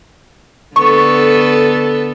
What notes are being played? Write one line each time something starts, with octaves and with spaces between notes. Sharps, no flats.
D3 B3 A4 C#6